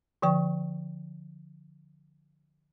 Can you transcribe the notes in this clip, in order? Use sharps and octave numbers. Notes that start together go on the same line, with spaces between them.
D3 F3 G5 C#6